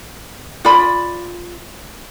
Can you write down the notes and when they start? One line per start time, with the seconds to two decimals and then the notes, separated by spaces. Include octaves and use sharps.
0.65 F4 D5 B5